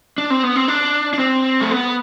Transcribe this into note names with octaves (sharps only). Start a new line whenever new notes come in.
D4
C4
B3
C4
D4
D4
C4
A3
B3